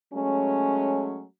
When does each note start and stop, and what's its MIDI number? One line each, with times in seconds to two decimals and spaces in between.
0.14 1.25 54
0.14 1.25 56
0.14 1.25 57
0.14 1.25 61